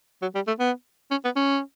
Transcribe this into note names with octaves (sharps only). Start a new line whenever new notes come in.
F#3
G3
A3
B3
C#4
B3
C#4